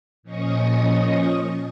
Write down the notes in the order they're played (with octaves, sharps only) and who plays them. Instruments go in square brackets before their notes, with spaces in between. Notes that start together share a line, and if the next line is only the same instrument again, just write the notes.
[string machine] A#2 F3 C#4 D#5 C#6 D#6